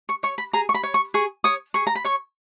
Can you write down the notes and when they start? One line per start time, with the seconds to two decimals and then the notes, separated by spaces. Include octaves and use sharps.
0.09 C#6
0.23 C#5 C#6
0.38 B5
0.53 G#4 A#5
0.69 C#6
0.74 B5
0.83 C#5
0.94 C#6
1.14 G#4 C#6
1.44 C#5 D#6
1.74 G#4 C#6
1.87 A#5
1.95 B5
2.04 C#5 C#6